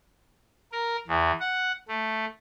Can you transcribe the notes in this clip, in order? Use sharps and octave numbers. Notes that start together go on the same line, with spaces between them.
A#4
E2
F#5
A3